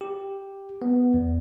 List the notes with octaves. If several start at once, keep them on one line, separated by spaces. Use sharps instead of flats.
G4
B3
E2